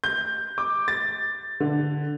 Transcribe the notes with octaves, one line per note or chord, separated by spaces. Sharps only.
G6
D6
A6
D3